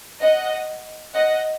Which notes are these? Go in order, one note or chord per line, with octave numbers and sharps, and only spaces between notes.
D#5 F#5
D#5 F#5